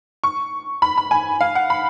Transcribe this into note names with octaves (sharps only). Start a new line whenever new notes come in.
C#6
B5
B5
G#5
F5
F#5
B5